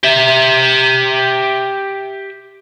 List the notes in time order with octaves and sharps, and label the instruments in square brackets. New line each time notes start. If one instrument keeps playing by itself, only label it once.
[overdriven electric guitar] G4 E5